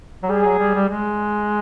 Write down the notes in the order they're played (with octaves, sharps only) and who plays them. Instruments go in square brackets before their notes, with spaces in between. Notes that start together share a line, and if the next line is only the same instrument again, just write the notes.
[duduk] F#3
[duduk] G3 [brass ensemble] G#4
[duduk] F#3
G3
G3
G#3